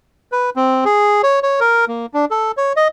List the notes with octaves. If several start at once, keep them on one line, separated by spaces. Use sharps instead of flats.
B4
C4
G#4
C#5
C#5
A#4
A#3
D4
A4
C#5
D#5